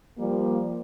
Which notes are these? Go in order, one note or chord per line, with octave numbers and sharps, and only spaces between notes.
F3 G3 A#3